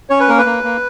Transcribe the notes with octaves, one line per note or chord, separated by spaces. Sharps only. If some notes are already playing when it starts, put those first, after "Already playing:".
C#4 C#5
B4
A#3 A#4
B4
A#3
A#3